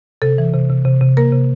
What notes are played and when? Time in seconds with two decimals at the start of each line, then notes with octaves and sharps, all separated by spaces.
0.22 C3 A4
0.38 E3
0.54 C3
0.70 C3
0.85 C3
1.01 C3
1.17 A#3 A#4
1.32 C3